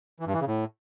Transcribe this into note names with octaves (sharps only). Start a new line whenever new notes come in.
E3
G2
E3
C#3
A2